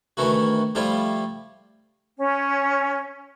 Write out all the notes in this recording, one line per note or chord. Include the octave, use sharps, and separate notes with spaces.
D2 D#3 E3 A3 E4 F#4
F3 G3 A3 E4 F4 G4
C#4